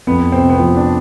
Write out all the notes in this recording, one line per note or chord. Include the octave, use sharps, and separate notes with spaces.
F2 B3
C3 C4
B3
F3 C4
D4